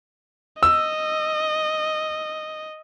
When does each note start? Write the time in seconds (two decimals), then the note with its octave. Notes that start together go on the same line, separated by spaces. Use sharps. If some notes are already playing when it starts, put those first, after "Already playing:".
0.63 D#5 E6